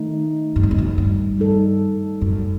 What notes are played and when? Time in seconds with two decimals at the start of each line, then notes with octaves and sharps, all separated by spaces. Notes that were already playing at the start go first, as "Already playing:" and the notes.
Already playing: D#3 A3 D#4
0.56 G2
0.63 F#2
0.71 E2
0.78 F#2
0.98 G2
1.38 G3 D#4 A4
2.21 F#2